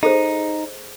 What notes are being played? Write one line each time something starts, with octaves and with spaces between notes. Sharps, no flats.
D#4 G#4 A4 C5